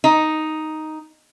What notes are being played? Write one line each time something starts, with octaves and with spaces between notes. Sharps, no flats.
D#4